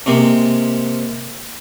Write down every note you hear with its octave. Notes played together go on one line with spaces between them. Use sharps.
C3 G#3 A#3